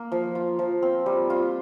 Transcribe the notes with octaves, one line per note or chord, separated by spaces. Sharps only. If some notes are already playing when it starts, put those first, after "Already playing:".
Already playing: A#3
F3
F4
F3
C4
G3
F4